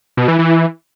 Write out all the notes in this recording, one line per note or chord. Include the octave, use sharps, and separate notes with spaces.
B2
E3
E3